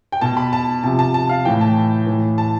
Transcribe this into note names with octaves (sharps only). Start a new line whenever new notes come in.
G5
B2 A5
B5
A5
C3 F3 A5
A5
A5
F5
A2 E3 G5
A5
A2 E3
A5